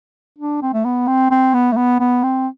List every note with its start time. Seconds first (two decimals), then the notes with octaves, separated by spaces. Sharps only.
0.39 D4
0.62 C4
0.73 A3
0.85 B3
1.07 C4
1.31 C4
1.54 B3
1.72 A3
1.76 B3
2.00 B3
2.23 C4